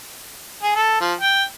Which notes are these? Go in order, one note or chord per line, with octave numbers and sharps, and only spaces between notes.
G#4
A4
F3
G5